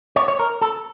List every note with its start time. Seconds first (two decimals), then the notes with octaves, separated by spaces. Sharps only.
0.16 C#5
0.28 C#5
0.39 A#4
0.62 A4